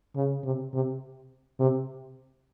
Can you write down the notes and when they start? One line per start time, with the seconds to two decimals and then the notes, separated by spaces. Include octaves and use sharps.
0.16 C#3
0.44 C3
0.73 C3
1.59 C3